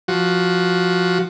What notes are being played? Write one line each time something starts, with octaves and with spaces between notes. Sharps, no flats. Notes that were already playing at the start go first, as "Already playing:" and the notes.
F3 F#4